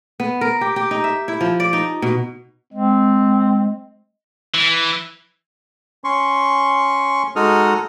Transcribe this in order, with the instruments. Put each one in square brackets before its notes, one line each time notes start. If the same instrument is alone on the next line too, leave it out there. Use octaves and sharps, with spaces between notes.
[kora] B3
A#4
G4
G4
D#4
E5
E4
F3
D5
D#4
B2
[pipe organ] G#3 [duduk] C4
[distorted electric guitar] E3
[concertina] C#4 C6 C#6
G#3 D#4 F#4 A4 D#6 F6